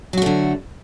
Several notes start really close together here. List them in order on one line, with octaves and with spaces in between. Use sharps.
F#3 F#4 A3 D3